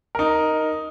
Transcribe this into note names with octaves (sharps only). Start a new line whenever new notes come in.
D#4 A#4